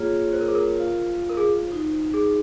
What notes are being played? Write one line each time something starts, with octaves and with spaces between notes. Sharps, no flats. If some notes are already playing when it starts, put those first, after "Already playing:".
Already playing: A#3 F4 G#4 C#5
C5
A#4
G#4
A#4
F4 C5 F5
A#4
G#4
D#4 F#4 C5
G#4